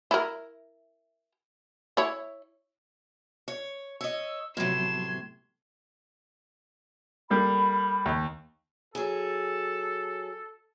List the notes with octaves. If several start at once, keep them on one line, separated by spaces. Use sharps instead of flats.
E4 A#4
E4 C#5
C#5
C#5 D#5 E6
A2 C3 F3 F#3 B3 C6 G#6 E7
G3 A#3 A4 B5
D#2
F#3 G#4 A4